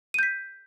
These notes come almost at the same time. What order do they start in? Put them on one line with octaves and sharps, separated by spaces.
D#7 G6 B6